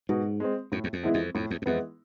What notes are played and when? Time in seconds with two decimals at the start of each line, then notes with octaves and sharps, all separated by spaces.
0.09 G#2 B2
0.40 G#3 C4
0.72 F#2 A2
0.84 E2
0.93 F2
1.03 E3 G#3 B3 E4
1.14 F2
1.35 F2 A2
1.51 E2
1.62 F#2
1.66 F2 E3 G#3 B3 E4